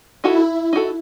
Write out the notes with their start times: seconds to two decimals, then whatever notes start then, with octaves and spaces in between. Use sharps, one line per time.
0.24 D#4 E4 F#4 A4
0.73 D#4 F#4 A4